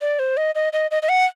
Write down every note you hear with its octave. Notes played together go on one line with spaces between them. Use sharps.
D5
C5
D#5
D#5
D#5
D#5
D#5
F#5